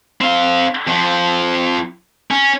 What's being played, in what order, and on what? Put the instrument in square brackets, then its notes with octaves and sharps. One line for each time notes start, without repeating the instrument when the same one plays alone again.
[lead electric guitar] C4 F5
F2 F3
C#4